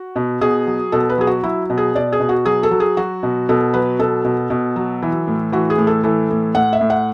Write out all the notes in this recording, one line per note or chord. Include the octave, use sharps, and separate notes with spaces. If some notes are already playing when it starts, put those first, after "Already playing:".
Already playing: F#4
B2
B2 G#4
F#3
B2 A4
B4
F#3 G#4
F#4
F#3 E4
B2
G#4
B2 D5
G#4
B2
F#4
F#3 G#4
A4
F#3
G#4
F#3 F#4
B2
B2 A4
F#3 B4
B2 A4
B2
B2
F#3
E3
A2
E3 F#4
G#4
A2
A4
E3 A4
A2
A2 F#5
E5
A2
F#5